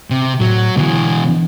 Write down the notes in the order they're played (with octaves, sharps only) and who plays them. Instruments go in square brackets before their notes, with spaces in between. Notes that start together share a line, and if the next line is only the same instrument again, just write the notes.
[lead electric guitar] C3
[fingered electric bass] A2 [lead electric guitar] F#3
[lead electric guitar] B2 E3 [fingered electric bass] D3 B3
[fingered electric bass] E3 D4